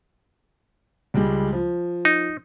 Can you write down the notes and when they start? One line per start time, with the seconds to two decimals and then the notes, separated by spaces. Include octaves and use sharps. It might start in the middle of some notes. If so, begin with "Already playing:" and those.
1.14 C#2 G3 G#3
1.53 F3
2.05 D#4